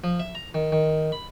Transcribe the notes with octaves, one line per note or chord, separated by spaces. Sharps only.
F3
E5
A#5
D#3
D#3
B5